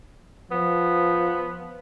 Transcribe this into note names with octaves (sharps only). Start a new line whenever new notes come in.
F3 B3